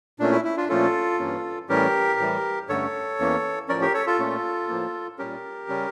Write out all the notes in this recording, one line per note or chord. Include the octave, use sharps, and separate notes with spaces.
A#2 A3 C#4 D4
E4
E4
D4 F4
A#2 F3 A3 C#4 F4 A4
G2 E3 A#3 C#4
A2 E3 G3 C#4 G4 A#4
A2 E3 G3
G2 D3 A3 C#4 A4 C#5
E2 E3 A#3 C#4
A2 F3 C#4 A#4 D5
G4 A#4
A4 C#5
F4 A4
A#2 A3 C#4
A2 F3 A#3
A#2 G3 C#4 G4 A#4
C#3 G3 C#4